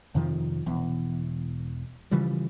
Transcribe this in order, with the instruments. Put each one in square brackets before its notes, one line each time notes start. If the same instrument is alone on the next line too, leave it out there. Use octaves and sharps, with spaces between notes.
[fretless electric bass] F2 C3 D#3 F3
E1 E2
C#3 E3 F3 G3